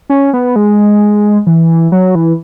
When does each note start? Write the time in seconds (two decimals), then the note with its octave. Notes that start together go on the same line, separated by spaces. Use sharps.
0.10 C#4
0.33 B3
0.56 G#3
1.47 E3
1.92 F#3
2.15 E3